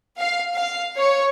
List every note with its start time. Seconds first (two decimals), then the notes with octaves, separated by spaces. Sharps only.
0.17 F5
0.52 F5
0.97 C#5